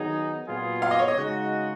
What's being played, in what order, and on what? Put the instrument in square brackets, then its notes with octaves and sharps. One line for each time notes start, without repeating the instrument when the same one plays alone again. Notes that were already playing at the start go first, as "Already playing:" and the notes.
Already playing: [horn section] D#3 F#3 B3 D#4 [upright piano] G#4
[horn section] A#2 F#3 B3 F4 G#4
[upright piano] F5
D#5
C#5
D#5
[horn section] C#3 G#3 D#4 F#4